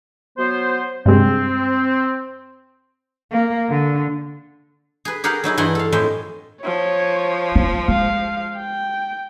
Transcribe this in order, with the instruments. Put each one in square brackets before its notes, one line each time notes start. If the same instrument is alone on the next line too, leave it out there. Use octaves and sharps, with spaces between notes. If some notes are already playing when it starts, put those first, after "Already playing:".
[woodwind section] F#3 B3 C5
[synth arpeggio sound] G2 C3 G#3 [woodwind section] C4
[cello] A#3
D3
[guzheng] G#4 B4
G4 G#4 A#4 F5 F#5
F#3 D#4 E4 G#4
G2 E3 A#4 F#5 G#5 C6
A4 F5
F2 A2 G#3 A4 G5
[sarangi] F3 [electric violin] C#5
[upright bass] F4
[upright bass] G#3 [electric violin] F5
[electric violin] G5